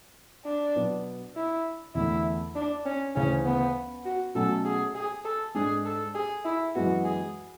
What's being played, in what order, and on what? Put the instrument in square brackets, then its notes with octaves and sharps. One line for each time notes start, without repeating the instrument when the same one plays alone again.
[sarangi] D4
[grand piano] B2 F#3 B3
[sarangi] E4
[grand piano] E2 D3 A3 [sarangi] E4
[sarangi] D4
C#4
[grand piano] D2 C#3 E3 [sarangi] C#4
[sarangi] B3
F#4
[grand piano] B2 F#3 A3 C#4 [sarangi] A4
[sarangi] G#4
G#4
A4
[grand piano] G#2 G#3 D4 [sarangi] G#4
[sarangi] A4
G#4
E4
[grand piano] F#2 E3 G#3 B3 [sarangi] F#4
[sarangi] G#4